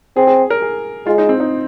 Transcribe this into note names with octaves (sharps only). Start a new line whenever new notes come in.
C4 G#4
G#4
A#4
G#4
G#3 F4
D#4
C4
D#4